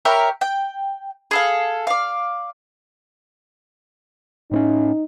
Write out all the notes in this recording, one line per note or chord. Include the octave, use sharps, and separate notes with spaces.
G4 A#4 C#5 E5
G5
G#4 A4 F5
D5 F5
A2 C4 C#4 D#4